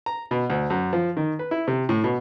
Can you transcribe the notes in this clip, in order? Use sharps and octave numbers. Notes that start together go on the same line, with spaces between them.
A#5
B2
D2
F#2
F3
D#3
B4
E4
C3
A2
B2